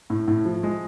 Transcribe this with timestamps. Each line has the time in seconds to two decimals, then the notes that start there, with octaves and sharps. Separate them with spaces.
0.10 A2
0.28 A2
0.45 F3
0.63 G#3